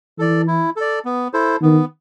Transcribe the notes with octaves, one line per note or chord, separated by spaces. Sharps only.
E3 A4 D5
E4
A4 D5
B3
E4 A4 C5
D#3 B3